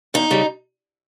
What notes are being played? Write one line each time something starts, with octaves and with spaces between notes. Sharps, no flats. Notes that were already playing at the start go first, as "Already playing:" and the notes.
E2 D#4
C#3 G3